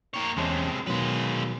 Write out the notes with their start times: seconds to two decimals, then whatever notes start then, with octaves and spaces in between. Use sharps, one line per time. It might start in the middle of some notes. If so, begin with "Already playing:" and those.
0.14 A#3 C#5
0.37 E2 C3 G#3 C#4 A5
0.87 B2 D#3 F#3 G#3 B4